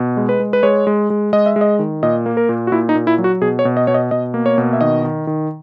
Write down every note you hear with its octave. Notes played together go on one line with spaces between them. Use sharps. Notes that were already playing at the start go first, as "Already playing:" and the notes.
Already playing: B2
G#3
B4
G#3
B4
G#3 C#5
G#3
G#3
G#3 D#5
E5
G#3
D#5
D#3
A#2 D#5
A#3
A#4
A#2
F#4
A#2 E4
D#4
A#2
E4
F#3
F#4
B2 G#4
C#5
B2
D#5
B2 C#5
D#5
B2 D#5
A#3
C#5
B2
E5
D#3 D#5
D#3
D#3